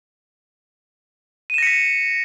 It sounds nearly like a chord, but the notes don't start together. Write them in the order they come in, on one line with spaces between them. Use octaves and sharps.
D#7 E7 A#6 C#7 B6